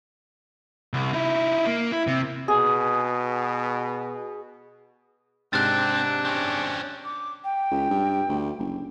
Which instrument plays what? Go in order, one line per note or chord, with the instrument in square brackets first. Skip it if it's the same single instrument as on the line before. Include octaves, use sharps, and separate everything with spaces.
[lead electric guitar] C2
D#4 E4
A#3
E4
C3
[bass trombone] B2 [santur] G#4
[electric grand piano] G#2 C3 F6 [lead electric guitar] C4 [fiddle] D4 [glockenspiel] F#6 A6
[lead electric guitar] C4 C#4
[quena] D6
G5
[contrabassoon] C#2
G2
D2
F#1